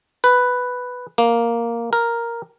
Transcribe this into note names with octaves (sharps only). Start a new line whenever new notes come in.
B4
A#3
A#4